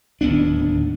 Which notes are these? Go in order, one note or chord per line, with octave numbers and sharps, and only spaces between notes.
D1 D#2 B3 D4